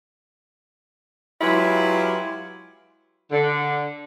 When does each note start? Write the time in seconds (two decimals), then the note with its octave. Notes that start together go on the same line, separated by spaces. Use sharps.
1.42 F#3 G#3 E4 F4 G4 B4
3.32 D3